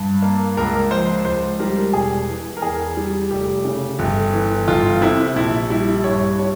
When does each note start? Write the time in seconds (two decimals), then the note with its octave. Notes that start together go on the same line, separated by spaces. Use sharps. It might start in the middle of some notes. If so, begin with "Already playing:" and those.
Already playing: G2
0.22 A#3
0.57 C#2 A#4
0.91 F3 C5
1.25 C#2 C5
1.60 G3 A#4
1.93 E1 G#4
2.29 E3
2.57 A#4
2.62 E2 G#4
2.97 G3
3.31 F1 G4
3.65 C#3
3.99 G1
4.33 E3
4.68 G1 F4
5.01 C3 E4
5.36 A#1 E4
5.70 G3 E4
6.04 G2 C#5
6.39 G3 C#5